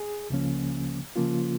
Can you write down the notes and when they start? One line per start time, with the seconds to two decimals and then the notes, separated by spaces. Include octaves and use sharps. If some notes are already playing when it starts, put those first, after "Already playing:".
Already playing: G#4
0.30 C#2 C#3 F3 A#3 C#4
1.16 C#3 F3 A#3 C#4 F4